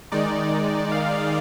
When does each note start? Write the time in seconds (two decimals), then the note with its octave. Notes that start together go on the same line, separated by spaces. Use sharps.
0.12 D#3 G#3 D#4 D5
0.92 F5